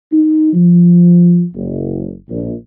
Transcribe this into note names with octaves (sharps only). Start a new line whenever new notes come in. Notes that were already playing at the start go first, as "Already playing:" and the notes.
D#4
F3
F#1
A#1